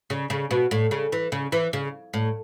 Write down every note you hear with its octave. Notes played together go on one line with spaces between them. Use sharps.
C#3
C#3
B2
A2
C#3
E3
C#3
E3
C#3
A2